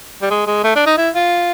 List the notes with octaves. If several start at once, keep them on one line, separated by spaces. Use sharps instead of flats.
G3
G#3
G#3
A3
D4
D#4
E4
F4